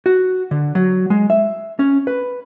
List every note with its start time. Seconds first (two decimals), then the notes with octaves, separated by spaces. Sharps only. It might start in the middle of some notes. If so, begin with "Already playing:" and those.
0.06 F#4
0.51 D3
0.75 F#3
1.10 G#3
1.30 E5
1.79 C#4
2.07 B4